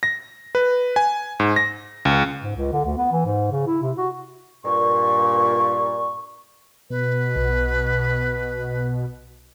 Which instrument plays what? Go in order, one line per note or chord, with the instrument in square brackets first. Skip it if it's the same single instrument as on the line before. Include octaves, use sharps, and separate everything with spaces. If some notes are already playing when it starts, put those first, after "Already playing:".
[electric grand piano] A#6
B4
G#5
G#2
A#6
C#2
[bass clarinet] G#2
C#2
D3
D2
B3
E3
G#2
C#3
E4
C3
F#4
[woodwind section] G2 A#2 [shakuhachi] C#6
[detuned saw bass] B2 [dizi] B4
[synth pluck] B1